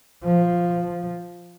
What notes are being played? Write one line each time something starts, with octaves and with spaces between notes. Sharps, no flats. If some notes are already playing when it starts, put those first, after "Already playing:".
F3